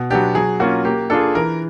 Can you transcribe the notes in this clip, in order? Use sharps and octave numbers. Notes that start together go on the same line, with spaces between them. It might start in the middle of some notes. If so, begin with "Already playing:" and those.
Already playing: B2
F#3 B3 D4 G4
F#3 G#4
A#3 C#4 F4 F#4
A#3 G4
D4 F4 G#4 A4
E3 A#4